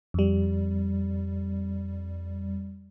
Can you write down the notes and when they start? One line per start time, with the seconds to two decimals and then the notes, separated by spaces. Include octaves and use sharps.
0.14 F2 G3